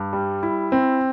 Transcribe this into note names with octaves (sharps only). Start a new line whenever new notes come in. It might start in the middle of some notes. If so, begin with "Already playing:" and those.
Already playing: G2
G3
E4
C4